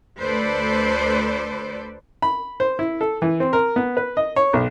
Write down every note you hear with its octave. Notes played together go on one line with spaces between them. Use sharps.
D2 A4 B4 C5 D5
B5
C5
E4
A4
E3
C4
A#4
B3
B4
D#5
C#5
B1